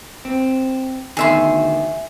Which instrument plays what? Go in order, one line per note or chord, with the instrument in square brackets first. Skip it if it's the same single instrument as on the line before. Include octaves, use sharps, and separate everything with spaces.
[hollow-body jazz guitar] C4
[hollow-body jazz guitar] D2 B2 D#3 [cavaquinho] G#4 E5 C6